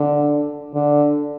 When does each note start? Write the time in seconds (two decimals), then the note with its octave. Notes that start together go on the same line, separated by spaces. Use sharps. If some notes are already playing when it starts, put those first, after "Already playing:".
Already playing: D3
0.74 D3